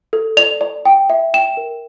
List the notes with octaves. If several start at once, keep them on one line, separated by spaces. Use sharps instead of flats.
A4
D5 F7
D5
G5
E5
G5 E7
A#4